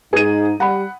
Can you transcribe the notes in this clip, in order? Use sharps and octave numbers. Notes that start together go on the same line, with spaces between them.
G#2 D#4 G#4 D#7
G3 F#5 B5